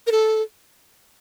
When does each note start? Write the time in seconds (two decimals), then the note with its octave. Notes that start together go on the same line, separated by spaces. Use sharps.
0.07 A#4
0.12 A4